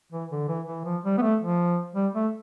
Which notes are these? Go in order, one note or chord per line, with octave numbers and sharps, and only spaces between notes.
E3
D3
E3
E3
F3
G3
B3
A3
F3
G3
A3